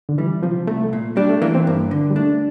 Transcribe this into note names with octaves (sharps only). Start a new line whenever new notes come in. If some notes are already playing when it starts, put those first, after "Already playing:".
D3
E3 G3
C3 F3
C2 A3
A#2
G3 D4
A3
E3 A#3
C4
G2 A#3
D3
G3
A3 D4